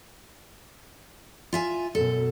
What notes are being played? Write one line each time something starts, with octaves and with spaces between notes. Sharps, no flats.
F4 E5 G#5
F#2 B2 A4